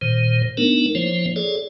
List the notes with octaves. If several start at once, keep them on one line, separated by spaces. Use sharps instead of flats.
A#2 D#3 C5
A3 B3 D4 D#4 A#4
F3 A#3 E4 C5 C#5
G#4 A4 C#5 D5